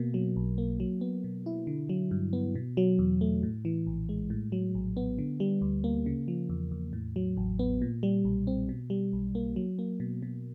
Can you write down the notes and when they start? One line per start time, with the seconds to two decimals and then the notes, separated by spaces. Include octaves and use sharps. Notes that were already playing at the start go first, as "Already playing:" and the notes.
Already playing: B2 A#3
0.14 F#3
0.36 B1
0.58 A#3
0.80 F#3
1.01 B3
1.24 B2
1.46 E4
1.67 D3
1.89 F#3
2.11 G2
2.33 B3
2.55 B2
2.77 F#3
2.99 E2
3.21 A3
3.43 A2
3.65 E3
3.87 A#1
4.09 G#3
4.30 A2
4.52 F#3
4.75 A#1
4.97 B3
5.18 D3
5.40 G3
5.62 D2
5.84 A#3
6.06 C#3
6.28 F3
6.49 E2
6.71 E2
6.93 A2
7.16 F#3
7.37 A1
7.59 B3
7.82 A#2
8.03 G3
8.25 B1
8.47 C4
8.69 B2
8.90 G3
9.13 B1
9.35 A#3
9.56 F#3
9.79 A#3
10.00 B2
10.22 B2